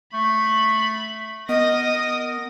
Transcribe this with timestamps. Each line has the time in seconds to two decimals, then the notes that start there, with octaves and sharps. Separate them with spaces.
0.14 A3 B5
1.49 B3 A#4 D#5 D#6 A#6